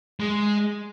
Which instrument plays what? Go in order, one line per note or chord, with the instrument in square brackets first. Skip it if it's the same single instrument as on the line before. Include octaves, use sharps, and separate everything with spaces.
[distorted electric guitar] G#3